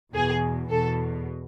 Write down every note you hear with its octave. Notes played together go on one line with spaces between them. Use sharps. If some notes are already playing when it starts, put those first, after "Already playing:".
E2 B2 G#4
E2 B2 A4